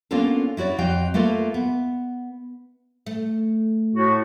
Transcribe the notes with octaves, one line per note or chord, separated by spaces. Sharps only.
A#3 B3 C#4 D4 F4 A4
E4 F#4 C#5 D5
F2 F#4 D#5 F5 G5
A3 A#3 F4 A4 B4
B3
A3
A2 F#4